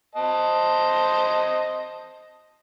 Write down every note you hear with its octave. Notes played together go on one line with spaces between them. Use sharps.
C5 D#5 A5